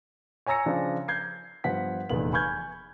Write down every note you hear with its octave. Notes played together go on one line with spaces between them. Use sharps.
C#5 G#5 A#5 E6 A#6 C#7
C#3 F3 D4
G6 G#6 C7
G2 F3 B3 F#5 B6
F1 E2 A#2 B3 F#7
G#5 B5 C#6 F6 G6 G#6